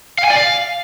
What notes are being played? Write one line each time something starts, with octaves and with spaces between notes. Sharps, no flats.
F5
G#5
D5
F5